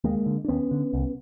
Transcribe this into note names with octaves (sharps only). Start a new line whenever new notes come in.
D#2 G#3 A#3
D3
D4
D#2 B3 C#4
D3
C2